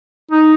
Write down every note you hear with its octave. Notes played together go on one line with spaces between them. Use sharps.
D#4